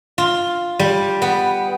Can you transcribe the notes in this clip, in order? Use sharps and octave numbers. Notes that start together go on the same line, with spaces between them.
F4
G3
B3